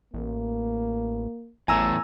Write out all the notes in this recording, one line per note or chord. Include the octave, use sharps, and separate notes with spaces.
A1 A#3
A1 E2 A2 A3 G#5 A#5 E6